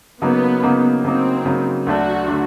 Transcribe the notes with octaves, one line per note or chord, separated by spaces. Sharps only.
C#3 F#3 A#3 B3 D#4
C#3 F#3 A#3 D#4
C#3 F#3 A#3 C4 D#4
C#3 F#3 A#3 D#4
D2 D3 F#3 A3 D4 F#4
D3 F#3 A3 D4